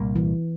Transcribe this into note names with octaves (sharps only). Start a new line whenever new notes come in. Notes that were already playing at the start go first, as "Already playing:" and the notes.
Already playing: C2 A#2 G3 A#3
E3